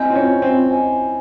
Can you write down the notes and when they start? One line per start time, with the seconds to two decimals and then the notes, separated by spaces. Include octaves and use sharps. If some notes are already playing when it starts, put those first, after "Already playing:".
Already playing: C4 E4 C5 D#5 G#5
0.10 C4
0.15 C#4
0.42 C4
0.68 E4 C5 D#5 G#5